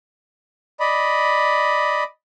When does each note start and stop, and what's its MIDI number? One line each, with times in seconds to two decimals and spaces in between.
0.80 2.03 74
0.80 2.03 75
0.80 2.03 83